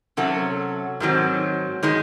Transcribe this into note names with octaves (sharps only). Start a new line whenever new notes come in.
C3 F#3 C#4 F#4 A4
G#2 D#3 F#3 C4
D#3 G#3 D#4